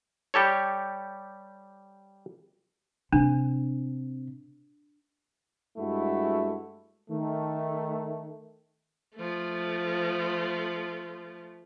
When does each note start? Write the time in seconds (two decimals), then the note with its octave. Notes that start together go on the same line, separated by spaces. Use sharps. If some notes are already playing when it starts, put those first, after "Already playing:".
0.34 G3 G4 A4 C#5
3.12 C3 D4
5.78 G2 G#3 A3 E4 F#4
7.11 D#3 A3
9.16 F3 A3